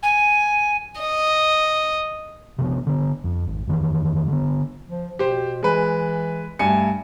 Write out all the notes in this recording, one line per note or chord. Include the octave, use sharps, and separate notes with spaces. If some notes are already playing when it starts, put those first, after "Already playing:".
G#5
D#5
C3 F3 B3
D3 B3
F2
G#1
F2 D#3 E3
D3 B3
F3
B2 G4 C5
E3 G#3 B4
G2 A3 G#5 C#7